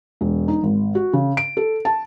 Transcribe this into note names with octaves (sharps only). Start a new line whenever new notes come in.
E1
D#4
G#1
F#4
C#3
D7
A4
A5